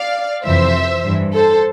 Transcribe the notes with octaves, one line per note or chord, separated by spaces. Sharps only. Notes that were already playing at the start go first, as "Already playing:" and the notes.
Already playing: D5 F5
F2 C3 E3 C5 E5
G2 E3
A4 C5